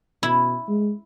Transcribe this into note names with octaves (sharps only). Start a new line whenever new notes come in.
B2 E4
G#3